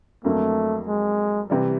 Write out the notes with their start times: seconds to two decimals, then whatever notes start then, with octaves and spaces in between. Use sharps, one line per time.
0.24 F2 D3 F#3 A3 A#3
0.87 G#3
1.50 C3 E3 G3